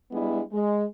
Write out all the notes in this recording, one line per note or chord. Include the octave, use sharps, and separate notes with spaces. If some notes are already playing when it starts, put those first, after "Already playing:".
G3 G#3 B3 D4 E4
G#3